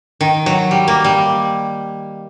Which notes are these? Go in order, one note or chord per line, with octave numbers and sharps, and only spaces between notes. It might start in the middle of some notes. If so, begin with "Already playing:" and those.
D#3
F#3
G3
A#3
G3